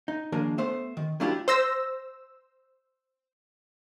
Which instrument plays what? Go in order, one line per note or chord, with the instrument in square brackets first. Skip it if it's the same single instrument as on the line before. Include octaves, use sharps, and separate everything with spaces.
[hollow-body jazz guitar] D#4
D#3 F3 G#3 A#3 D4
A3 B3 C5 E5
D#3
F#3 C#4 D4 E4 F4 G4
[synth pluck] C5 E6 A#6